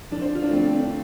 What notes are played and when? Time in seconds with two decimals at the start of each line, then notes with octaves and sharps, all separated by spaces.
0.11 F2 D4
0.22 C5
0.32 D3 F4
0.43 D4
0.49 A3
0.53 F2 C4
0.67 C4
0.75 D3
0.81 D4